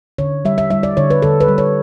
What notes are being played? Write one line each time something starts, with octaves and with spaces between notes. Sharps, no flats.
D3 C#5
G3 E5
E5
G3 E5
D5
D3 C#5
B4
D3 A4
B4
G3
C#5